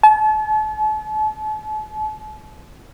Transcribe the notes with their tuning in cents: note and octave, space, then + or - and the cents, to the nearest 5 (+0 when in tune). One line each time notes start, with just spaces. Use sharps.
A5 -40